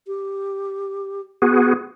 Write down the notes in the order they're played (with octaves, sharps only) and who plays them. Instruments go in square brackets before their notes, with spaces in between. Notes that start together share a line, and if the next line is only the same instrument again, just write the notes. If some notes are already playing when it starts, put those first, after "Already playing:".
[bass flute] G4
[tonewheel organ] B3 F#4 G#4